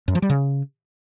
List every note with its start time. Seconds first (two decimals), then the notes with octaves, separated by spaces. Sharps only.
0.08 F#2
0.15 F3
0.22 G3
0.30 C#3